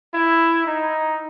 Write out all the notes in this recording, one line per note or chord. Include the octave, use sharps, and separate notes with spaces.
E4
D#4